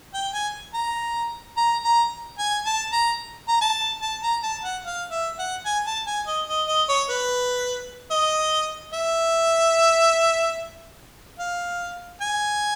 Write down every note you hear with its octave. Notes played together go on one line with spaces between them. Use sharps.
G5
G#5
A#5
A#5
A#5
G#5
A5
A#5
A#5
A5
A5
A#5
A5
F#5
F5
E5
F#5
G#5
A5
G#5
D#5
D#5
D#5
C#5
B4
D#5
E5
F5
G#5